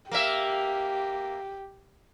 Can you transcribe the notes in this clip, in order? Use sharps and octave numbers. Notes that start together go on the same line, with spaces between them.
A#3 G4 E5